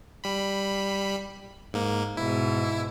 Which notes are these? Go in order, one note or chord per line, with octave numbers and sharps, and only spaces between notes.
G3 B5
G#2 A#3
G#2 B2 E4